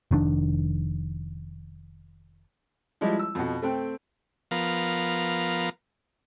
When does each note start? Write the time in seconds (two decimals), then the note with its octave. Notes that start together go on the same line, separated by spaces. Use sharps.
0.11 F1 D#3 C4 D4
3.01 F3 G3 G#3 E4 G4
3.19 E6
3.35 F2 B2
3.62 A3 C4 G5
4.51 F3 B3 A#4 F5